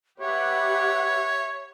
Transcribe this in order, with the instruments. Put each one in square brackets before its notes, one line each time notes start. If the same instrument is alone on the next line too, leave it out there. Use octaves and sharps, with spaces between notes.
[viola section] G4 B4 F#5 [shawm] C#5 [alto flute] E5